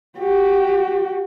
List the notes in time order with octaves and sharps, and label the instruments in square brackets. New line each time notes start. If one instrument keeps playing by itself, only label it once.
[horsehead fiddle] F#4 G4